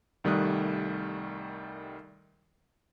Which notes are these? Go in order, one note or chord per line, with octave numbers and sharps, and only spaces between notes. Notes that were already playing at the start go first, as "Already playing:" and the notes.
C2 D#3 G3 A3 D#6 F#6